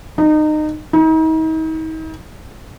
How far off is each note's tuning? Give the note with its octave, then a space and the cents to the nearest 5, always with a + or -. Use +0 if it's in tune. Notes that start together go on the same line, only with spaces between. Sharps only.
D#4 -25
D#4 +40